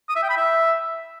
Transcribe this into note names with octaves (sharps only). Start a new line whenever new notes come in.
D#6
E5
G5
B5
E5